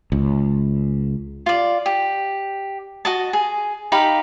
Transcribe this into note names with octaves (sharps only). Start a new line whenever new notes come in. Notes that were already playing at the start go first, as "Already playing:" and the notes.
C#2
F4 D5
G4
F#4 D#5 A5
G#4
D#4 G4 F5 B5